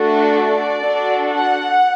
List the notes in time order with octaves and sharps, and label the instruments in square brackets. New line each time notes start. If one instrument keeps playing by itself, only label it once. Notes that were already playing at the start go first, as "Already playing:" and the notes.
Already playing: [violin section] A3 D4 F#4 A4
D5
D4 F#4 A4
F#5